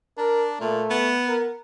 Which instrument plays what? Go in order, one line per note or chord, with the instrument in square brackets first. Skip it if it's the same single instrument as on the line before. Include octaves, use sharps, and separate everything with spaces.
[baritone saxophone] D4 [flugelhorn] A#4
[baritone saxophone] A#2 [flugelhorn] A3
[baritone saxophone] B3
[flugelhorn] A#4